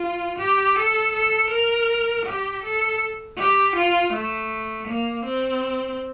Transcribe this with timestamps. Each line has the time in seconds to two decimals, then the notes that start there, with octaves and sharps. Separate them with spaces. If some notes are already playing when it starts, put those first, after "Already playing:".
Already playing: F4
0.39 G4
0.75 A4
1.13 A4
1.51 A#4
2.26 G4
2.63 A4
3.38 G4
3.76 F4
4.13 A3
4.88 A#3
5.25 C4